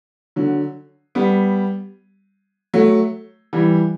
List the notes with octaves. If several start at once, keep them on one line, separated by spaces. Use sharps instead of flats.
D3 F#3
G3 B3
F#3 A3
E3 G3